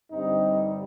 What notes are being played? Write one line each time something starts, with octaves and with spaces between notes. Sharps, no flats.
G2 D3 G3 C4 D#4